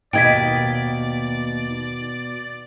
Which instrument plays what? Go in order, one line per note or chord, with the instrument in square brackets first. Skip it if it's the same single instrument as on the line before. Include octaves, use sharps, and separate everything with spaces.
[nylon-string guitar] D#2 D#5 [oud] B2 [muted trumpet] D5 [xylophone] G5 G#6 B6